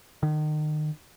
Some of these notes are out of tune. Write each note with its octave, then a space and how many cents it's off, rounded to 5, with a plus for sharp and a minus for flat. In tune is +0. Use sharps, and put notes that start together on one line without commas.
D#3 -35